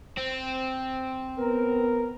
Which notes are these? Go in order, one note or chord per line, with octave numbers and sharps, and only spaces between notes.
C4
B3 A#4